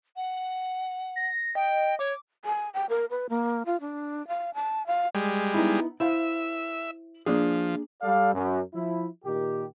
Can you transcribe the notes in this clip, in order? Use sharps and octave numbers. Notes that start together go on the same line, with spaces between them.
F#5
A#6
D#5 G5
C#5 D6
G#5
G5
A#4
B4
A#3
F4
D4
F5
A5
F5
G3 G#3
B3 D#4 E4
E4 C5 E5 F5
F3 A#3 D4 G#4
G3 A4 D5 F5
F#2
F3 E4
A#2 D#3 G4